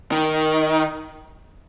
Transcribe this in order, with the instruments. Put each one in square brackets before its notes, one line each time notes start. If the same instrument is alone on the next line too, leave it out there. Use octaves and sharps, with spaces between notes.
[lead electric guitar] D#3